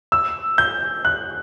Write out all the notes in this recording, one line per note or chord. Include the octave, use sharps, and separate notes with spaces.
E6
G6
F#6